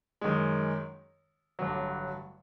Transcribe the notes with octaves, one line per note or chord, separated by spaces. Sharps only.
F#2 D#3 G#3
A1 G2 D3 F#3